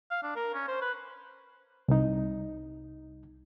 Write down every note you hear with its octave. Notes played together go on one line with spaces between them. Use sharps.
F5
D4
A#4
C#4
C5
B4
C2 D#4